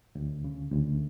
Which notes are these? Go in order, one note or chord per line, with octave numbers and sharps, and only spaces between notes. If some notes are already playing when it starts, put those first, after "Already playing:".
D2
C#3
D2